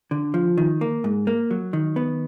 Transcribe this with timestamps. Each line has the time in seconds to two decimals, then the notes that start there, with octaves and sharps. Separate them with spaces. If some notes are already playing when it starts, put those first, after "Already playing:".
0.11 D3
0.34 F3
0.58 D#3
0.81 A#3
1.04 G#2
1.27 A#3
1.51 F#3
1.73 D#3
1.96 B3